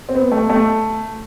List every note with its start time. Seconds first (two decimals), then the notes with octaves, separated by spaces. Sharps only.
0.09 C4
0.15 B3
0.32 A3
0.50 A3